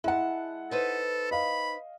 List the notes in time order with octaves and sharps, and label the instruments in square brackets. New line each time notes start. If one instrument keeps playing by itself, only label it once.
[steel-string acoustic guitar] G#3 A5 [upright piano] E4 F#5
[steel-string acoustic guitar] D#4 B4 C5 [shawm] A4
[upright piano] D#5 F5 [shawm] B5